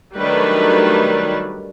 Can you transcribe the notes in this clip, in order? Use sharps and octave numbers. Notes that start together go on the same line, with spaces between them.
D#3 F#3 G3 A3 D4 B4